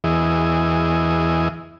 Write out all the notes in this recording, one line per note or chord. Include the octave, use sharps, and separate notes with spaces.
E2 E3 G#4 D#5